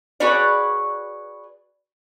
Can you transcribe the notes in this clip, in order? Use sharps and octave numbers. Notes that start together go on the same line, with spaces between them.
F#4 G#4 B4 C#5 D5